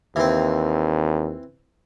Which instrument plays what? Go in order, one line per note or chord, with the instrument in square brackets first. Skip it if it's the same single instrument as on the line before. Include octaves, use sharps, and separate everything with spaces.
[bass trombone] D#2 [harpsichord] E3 C4